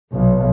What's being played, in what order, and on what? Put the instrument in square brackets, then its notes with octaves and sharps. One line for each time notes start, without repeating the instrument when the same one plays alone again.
[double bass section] B1